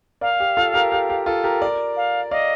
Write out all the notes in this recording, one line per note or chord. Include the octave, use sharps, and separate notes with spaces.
A#4 D5 F5
G4
F4 A4
G4 A#4
G4
G4
F4 A4
G4 A#4
A#4 D5
F5
D5 D#5 F5